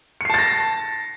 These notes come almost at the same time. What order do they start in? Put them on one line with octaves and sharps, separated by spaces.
C#7 C7 A5 A6 A#6